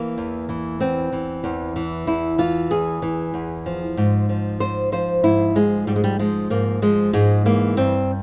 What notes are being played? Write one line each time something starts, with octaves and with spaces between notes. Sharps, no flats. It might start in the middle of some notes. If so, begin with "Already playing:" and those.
Already playing: E3 A#3
E2
E3
E2 C4
E3
E2
E3
E2 E4
E3 F4
E2 G#4
E3
E2
F3
G#2
F3
G#2 C5
F3 C5
G#2 E4
F3 G#3
G#2 G3
G#3
G3
F3 G#3
G#2 A#3
F3 G#3
G#2 G#3
E3 A#3
G2 C4